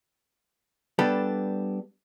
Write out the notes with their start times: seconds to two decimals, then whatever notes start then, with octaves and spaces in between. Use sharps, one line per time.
0.99 G3 B3 D4 A4